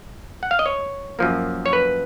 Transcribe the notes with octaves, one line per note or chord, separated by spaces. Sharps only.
F#5
F5
D#5
C#5
F#2 F3 A#3
C#5
B4